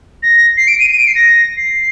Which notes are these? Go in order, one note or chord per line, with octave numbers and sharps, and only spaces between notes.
A#6
C7
D7
D#7
D#7
D7
C7
A#6
C7